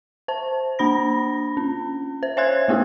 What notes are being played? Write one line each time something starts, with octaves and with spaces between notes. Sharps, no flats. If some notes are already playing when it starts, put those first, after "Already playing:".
C5 A5
A#3 D4 B5 A#6
C#4
C5
C#5 E5 G#5 C6 F#6 G#6
A3 B3 E4 G4